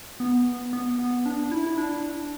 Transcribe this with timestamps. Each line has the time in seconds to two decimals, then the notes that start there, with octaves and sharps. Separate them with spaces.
0.20 B3
0.73 B3
0.99 B3
1.26 D4
1.51 E4
1.67 E4
1.78 D4